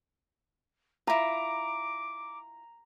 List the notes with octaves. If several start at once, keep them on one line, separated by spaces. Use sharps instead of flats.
E4 F4 A#5 D6